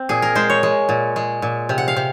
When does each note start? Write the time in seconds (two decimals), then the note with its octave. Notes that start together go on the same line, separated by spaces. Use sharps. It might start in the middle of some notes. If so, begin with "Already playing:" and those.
Already playing: C4
0.09 A#2 G#4
0.22 A#4
0.35 G#3 C5
0.50 C#5
0.63 G#3
0.89 A#2
1.16 G#3
1.42 A#2
1.69 C3
1.78 F#5
1.88 F5
1.97 C3